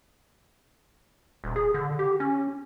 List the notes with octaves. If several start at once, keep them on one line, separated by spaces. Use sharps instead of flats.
D#1
G#4
D3
G4
C#4